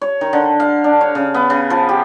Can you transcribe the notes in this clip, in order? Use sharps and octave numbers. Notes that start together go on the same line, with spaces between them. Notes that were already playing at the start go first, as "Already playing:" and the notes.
C#5
D#3
D3
F5
D4
C#5
C#3
B3
C#3
F3
G4